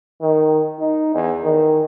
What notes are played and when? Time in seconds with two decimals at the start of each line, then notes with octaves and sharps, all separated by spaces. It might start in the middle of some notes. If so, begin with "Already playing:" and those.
0.21 D#3
0.79 D#4
1.14 E2
1.43 D#3